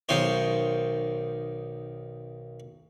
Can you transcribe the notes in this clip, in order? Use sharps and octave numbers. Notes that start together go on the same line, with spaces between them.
B1 D#3 C5 C#5